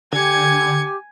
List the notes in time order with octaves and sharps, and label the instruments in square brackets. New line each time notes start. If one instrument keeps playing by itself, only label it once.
[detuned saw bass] D3 [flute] G4 [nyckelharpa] G#5 [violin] G#6 C#7